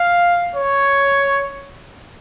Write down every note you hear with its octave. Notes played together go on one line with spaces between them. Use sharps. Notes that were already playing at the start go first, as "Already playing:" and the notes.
Already playing: F5
C#5